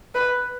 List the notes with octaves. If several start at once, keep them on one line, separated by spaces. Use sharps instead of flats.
B4